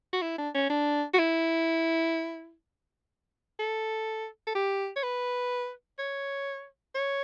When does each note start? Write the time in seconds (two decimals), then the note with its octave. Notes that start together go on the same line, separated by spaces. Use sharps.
0.13 F#4
0.22 E4
0.38 D4
0.55 C#4
0.70 D4
1.14 F#4
1.19 E4
3.60 A4
4.47 A4
4.55 G4
4.96 C#5
5.03 B4
5.99 C#5
6.95 C#5